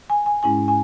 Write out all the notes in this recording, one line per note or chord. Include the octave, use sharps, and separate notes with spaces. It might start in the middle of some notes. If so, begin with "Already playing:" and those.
G#5
G#5
G#2 G#3 C#4 E4 G#5
G#5